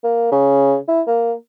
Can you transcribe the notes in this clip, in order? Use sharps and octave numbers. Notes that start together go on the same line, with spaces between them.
A#3
C#3
E4
A#3